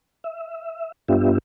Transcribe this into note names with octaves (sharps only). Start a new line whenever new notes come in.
E5
G2 B3 D4 F4 G4 E5